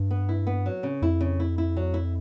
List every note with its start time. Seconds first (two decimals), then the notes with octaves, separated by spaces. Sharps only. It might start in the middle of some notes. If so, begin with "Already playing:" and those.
Already playing: G2
0.11 B3
0.29 E4
0.47 B3
0.66 F#3
0.83 C#3
1.02 F2 E4
1.21 C#3
1.40 E4
1.58 E4
1.77 F#3
1.94 E4